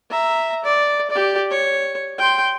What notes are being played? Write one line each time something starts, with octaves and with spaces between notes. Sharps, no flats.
E5 A#5
D5
G4 D5
C#5
G5 C6